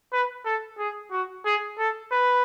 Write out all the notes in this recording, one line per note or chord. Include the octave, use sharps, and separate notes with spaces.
B4
A4
G#4
F#4
G#4
A4
B4